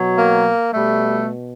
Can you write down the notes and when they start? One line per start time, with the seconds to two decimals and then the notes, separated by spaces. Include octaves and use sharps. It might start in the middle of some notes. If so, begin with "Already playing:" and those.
Already playing: B2 F#3
0.18 A#3
0.73 B2 G3 A3